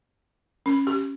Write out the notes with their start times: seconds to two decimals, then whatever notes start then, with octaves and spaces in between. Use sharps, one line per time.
0.66 C#4
0.87 G4